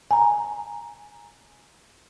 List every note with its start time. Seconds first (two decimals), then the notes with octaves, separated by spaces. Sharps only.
0.11 G#5 A#5